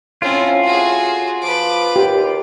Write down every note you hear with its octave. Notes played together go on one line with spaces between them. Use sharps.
A2 C4 C#4 F4
F#4 G#4
F3 B4 D6
D#2 G4